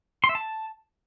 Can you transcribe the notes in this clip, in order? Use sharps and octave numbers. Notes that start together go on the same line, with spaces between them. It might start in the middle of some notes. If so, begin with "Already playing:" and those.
C6
E5
A5